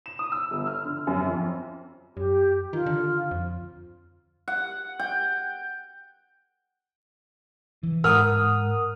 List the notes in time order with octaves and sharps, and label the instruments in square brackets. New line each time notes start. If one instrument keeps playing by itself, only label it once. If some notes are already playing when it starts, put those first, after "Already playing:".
[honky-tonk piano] E7
D#6
E6
G1
F6
D3
F#2
F2
[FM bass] F#2 [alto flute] G4
[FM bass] D#3 [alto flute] F4
[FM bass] D3
F2
[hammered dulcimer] F#5
G5
[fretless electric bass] E3
[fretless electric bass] G#2 [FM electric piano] A#4 F#5 D#6 [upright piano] F6